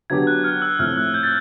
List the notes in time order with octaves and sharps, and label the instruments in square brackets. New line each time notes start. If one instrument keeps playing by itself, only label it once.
[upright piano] D3 F#3 B3 D4 G4 [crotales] G#6
[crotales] F#6
F6
E6
[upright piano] A2 F3 A3 C4 E4 [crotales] F6
[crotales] F#6
G6
A6